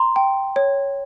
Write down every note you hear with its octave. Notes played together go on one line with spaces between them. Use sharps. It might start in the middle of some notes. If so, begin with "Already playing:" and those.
Already playing: A#5 C6
G5
C#5